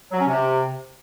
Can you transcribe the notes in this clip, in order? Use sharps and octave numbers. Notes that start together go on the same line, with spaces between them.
F#3
C#4
C3